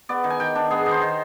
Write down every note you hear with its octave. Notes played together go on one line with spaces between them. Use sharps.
B3 D5
D#3
G#5
D#3 G5
D4
B3 G#4
D#3
C5
D#3